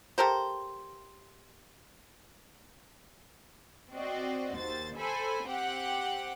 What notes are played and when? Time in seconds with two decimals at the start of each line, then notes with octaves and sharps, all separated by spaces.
0.18 G4 A4 A#4 C5
3.93 C4 F#4 D5 D#5
4.56 D#2 C5 A6
4.97 A4 C5 G#5 B5
5.47 C4 G4 F#5 G5